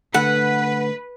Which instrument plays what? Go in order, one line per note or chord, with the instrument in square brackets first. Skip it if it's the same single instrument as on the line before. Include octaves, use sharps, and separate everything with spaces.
[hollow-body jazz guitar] D3 A3 A4 [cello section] B4 [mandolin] F#5